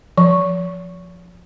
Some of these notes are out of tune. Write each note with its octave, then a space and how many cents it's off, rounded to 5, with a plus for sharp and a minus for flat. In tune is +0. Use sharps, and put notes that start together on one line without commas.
F3 +5